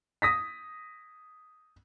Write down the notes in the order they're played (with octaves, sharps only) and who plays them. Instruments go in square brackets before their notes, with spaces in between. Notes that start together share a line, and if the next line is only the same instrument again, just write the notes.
[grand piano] D#6 A#6 B6